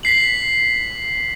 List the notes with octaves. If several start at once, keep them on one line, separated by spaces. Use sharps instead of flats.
B6 C7 F#7